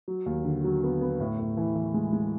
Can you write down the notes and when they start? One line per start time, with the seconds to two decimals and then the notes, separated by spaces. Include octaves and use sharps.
0.08 F#3
0.26 D#2
0.45 D3
0.64 F#3
0.83 B3
1.01 B3
1.20 A2
1.39 A2
1.57 E3
1.75 E3
1.94 G#3
2.13 G#3